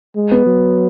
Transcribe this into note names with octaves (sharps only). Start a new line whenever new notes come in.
G#3
B3
F#3